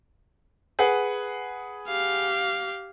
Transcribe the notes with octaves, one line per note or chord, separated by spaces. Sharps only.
G#4 B4 F#5
G4 F5